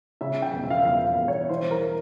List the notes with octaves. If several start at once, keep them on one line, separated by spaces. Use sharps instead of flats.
C#3 E5
G5
E1
E5
F5
E5
E2 F5
F5
E1
C#5
E3 C5
A#4